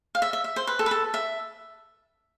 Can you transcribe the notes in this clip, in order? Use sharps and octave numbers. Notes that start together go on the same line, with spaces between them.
F5
E5
E5
E5
C5
B4
A4
B4
A4
E5